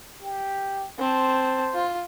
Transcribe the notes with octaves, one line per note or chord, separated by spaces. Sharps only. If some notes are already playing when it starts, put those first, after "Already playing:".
G4
C4 C5 A5
F4